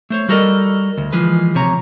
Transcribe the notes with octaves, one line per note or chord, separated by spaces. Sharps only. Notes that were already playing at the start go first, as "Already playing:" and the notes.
A3 C5 C#5
G3 F#4 A4 A#4 D5 D#5
D2
E3 F3 G#3 G#4 B4
D2 C3 C#5 A#5